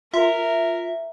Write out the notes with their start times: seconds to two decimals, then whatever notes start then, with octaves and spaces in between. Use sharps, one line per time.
0.14 F4 A#4 E5